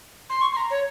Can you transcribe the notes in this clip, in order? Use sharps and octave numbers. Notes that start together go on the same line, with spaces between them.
C6
C#6
C6
A#5
C#5